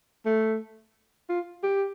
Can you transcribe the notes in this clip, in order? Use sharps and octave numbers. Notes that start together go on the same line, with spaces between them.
A3
F4
G4